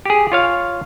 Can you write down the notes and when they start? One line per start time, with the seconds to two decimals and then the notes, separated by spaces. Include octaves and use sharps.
0.05 G4 G#4
0.32 F4 C#5 F5